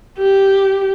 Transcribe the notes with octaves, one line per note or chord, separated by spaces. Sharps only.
G4